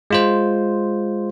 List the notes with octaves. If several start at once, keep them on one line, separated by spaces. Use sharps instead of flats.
G#3 F4 C5